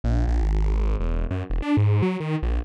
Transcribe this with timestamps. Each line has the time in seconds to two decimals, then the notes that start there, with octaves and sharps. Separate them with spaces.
0.04 A#1
0.28 A#1
0.42 G#1
1.00 E1
1.31 F#2
1.50 E1
1.62 D4
1.77 G#2
2.02 F#3
2.20 D#3
2.43 A#1